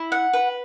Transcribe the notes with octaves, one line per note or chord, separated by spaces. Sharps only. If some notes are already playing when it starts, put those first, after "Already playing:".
Already playing: E4
F#5
B4